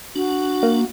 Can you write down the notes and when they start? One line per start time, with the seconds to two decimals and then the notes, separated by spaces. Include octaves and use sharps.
0.16 D4 F#4
0.63 A#3